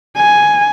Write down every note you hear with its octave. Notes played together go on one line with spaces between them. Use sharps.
G#5